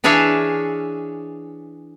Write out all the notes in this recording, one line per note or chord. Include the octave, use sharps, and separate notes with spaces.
E3 D4 G#4 C#5 E5 F5